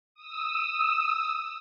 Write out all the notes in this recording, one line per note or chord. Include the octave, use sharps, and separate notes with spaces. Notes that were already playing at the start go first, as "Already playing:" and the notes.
D#6 E6